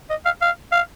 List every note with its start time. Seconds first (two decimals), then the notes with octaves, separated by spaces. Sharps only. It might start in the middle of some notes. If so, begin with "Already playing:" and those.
0.10 D#5
0.25 F5
0.41 F5
0.72 F5